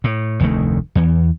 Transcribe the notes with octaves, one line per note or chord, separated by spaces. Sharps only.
A2
F1 D2 D#3 A3
E2 E3